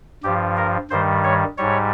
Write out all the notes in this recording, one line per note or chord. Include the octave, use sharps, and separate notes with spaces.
G2 F3 G4
A#4
G2 D#3 G3 C5
C#5
G#2 G3 C#5